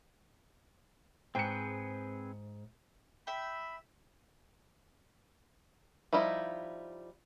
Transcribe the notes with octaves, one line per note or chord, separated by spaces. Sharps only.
G#2 C4 G#4 B4 G5 C#7
E5 G5 B5
F3 G3 D#4 E4